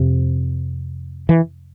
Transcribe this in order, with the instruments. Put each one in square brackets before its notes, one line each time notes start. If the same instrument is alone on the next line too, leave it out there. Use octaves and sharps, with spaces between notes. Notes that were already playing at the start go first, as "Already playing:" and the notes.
Already playing: [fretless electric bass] F2 C3
E3